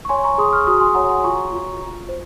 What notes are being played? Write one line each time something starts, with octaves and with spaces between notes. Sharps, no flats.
C#6
C#5 G#5 C6
A#5 C#6
G#4 C6 D#6
C#6 F6
F#4 C6 D#6
G#5 C6
C#5 F#5 A#5
G#5 C6
F4 A#5 C#6
F4
F4
C5